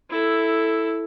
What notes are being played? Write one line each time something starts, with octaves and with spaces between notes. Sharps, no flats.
E4 A4